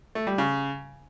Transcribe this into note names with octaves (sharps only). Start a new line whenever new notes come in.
A3
G3
C#3